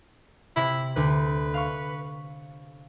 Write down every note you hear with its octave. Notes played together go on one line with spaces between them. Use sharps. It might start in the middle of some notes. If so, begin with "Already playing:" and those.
C3 E4
D2 B4
F5 C#6